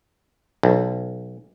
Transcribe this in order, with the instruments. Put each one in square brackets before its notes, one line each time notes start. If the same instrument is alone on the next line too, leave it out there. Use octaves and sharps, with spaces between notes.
[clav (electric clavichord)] B1